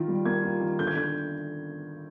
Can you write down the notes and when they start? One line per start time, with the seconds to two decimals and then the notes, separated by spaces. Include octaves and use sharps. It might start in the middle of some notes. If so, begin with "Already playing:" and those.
Already playing: D#3 F4
0.08 G3
0.25 A#3 G#6
0.43 F4
0.61 D#3
0.79 D3 G6
0.87 G#6
0.96 D3 G6